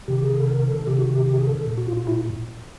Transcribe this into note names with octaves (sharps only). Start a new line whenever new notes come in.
C3 D#3 G4
G#4
A4
A#4
A4
C3 D#3 G4
F#4
G4
G4
G#4
A4
A4
A#2
F#4
F4
F4
E4